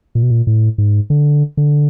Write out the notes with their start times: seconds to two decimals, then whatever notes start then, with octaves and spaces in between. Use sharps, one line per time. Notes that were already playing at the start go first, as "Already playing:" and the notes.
0.15 A#2
0.23 B2
0.30 A#2
0.47 A2
0.78 G#2
1.10 D3
1.57 D3